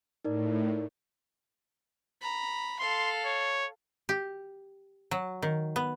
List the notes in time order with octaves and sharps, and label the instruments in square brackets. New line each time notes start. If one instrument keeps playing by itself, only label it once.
[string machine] A2 [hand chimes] D#4 A#4 D5
[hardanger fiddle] A#5 B5
[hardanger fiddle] A4 F5 [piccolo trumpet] C6
[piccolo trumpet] C#5
[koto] G4
F#3
D#3
B3